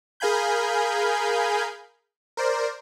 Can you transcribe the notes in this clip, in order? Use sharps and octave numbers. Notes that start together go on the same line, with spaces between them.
G#4 A#4 F5 G#5 B5 G6
A#4 C5 D5